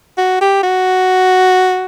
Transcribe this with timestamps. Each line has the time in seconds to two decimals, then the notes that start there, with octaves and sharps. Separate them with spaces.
0.18 F#4
0.41 G4
0.63 F#4